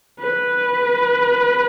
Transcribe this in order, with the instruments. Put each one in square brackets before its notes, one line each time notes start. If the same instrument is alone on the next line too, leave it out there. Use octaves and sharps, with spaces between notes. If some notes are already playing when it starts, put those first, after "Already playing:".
[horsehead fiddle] B4